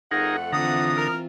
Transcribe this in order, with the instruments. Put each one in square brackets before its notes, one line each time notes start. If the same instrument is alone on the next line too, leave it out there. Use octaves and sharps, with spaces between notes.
[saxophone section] F2 A3 F#5 [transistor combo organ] D#4 G#4 A#4
[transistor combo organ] D3 A#5 [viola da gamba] E3 C4 F4 [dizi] D#6
[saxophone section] A#4